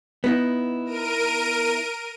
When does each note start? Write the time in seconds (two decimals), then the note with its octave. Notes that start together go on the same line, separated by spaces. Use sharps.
0.24 B3 D#4 E4
0.85 A#4 D7 D#7